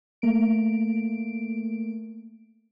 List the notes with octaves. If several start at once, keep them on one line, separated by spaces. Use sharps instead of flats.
A3 A#3 D7